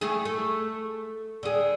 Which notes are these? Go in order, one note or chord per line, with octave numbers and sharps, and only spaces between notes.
A3 E4 G#4
A3
D3 G#4